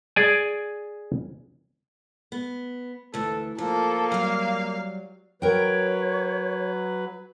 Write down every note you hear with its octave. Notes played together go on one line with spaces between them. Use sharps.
G#4 D5 G#5
B3
D2 E3 A4
F3 A#3 A4
F#3 G3 F5
F#3 A#4 B4 C#5 G5